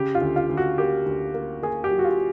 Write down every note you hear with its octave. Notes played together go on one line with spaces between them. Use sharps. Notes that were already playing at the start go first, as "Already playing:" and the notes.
Already playing: C#3 G4
F4
D2
F4
D2
F#4
A#3 G4
D2
A#3
A#3 G#4
G4
F#3
F#4
F4